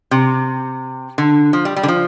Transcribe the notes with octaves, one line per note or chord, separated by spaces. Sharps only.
C3
D3
F3
G3
G3
D3
F3